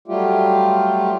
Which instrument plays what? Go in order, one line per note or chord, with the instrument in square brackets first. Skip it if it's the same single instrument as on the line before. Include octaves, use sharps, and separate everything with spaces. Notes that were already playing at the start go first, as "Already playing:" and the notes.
[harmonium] F#3 G3 A3 F4 G4